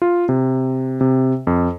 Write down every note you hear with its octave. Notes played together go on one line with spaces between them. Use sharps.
F4
C3
C3
F2